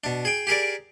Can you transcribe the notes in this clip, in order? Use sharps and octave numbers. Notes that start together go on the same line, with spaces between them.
B2 D4
G#4 G5
G4 G#4 A#4 D5